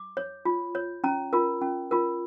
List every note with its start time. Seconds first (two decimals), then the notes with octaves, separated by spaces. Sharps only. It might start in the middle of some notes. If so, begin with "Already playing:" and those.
Already playing: D6
0.17 C#5
0.45 F4
0.75 C#5
1.04 C#4 A#5
1.33 F4 A#4
1.62 C#4
1.91 F4 A#4